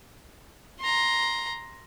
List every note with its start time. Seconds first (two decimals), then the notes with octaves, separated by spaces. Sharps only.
0.80 A#5 C6